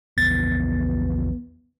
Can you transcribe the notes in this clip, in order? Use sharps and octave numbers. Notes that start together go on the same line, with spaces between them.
A#1 E2 B3 A6